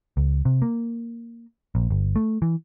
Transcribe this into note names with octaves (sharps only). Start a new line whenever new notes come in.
C#2
C3
A#3
A#1
G1
A3
E3